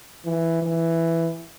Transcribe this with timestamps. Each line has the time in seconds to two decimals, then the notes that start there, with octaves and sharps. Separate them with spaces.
0.25 E3
0.62 E3